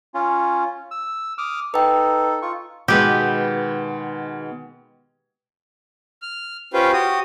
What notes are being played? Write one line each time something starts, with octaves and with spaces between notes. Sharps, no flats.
C#4 F4
E6
D6 D#6 F6
D#4 A4 B4 G5
F4 C#6
B2 D#3 G#3 B3 G4 B4
F6
C#4 F4 G4 B4 C5
F#4 G4 D#6